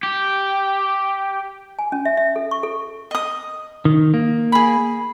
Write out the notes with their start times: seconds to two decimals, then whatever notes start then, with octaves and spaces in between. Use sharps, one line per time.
0.03 G4
1.79 G#5
1.92 C#4
2.05 E5
2.17 E5
2.36 A4
2.51 C#6
2.63 A4
3.11 D#5 D#6
3.85 D#3
4.14 A#3
4.52 G#4 B5